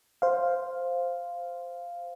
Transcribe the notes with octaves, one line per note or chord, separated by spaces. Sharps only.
C5 F5